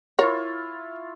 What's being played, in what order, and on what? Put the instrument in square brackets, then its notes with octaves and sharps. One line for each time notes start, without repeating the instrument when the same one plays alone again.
[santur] E4 F4 C#6 [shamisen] A#4 C#5